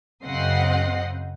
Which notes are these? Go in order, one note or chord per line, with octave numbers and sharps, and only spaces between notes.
F#2 C#3 C4 D#5 F#5 C7